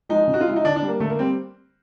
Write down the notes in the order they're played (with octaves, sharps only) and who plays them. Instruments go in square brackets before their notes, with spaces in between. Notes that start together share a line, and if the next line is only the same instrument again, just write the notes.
[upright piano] F3 G#3 D#4
C#3
F#4
F4
F3 G#3 E4
D#4
D3 D4
D4
G3
A#3
D3 A3
A#3
G3 C4